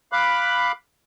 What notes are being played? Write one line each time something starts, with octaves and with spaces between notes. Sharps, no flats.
F5 B5 D6 F#6